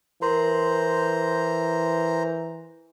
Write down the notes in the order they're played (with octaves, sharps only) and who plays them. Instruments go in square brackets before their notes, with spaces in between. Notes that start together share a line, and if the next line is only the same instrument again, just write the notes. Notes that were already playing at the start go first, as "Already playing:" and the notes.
[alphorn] E3 [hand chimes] A#4 C6 [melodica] C5 A#5